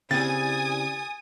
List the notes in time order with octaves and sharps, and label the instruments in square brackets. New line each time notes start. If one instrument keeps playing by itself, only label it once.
[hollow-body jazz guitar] C#3 C4 [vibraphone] E4 G4 D5 [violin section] G#5 D#6 [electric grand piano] A6